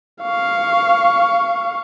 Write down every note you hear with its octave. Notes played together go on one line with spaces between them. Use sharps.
F5 C#6